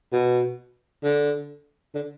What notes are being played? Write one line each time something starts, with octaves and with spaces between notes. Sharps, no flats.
B2
D3
D3